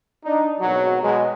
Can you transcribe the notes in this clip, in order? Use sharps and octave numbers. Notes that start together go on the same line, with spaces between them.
D4 D#4
G#1 B2 F#3
B2 F#3 G#3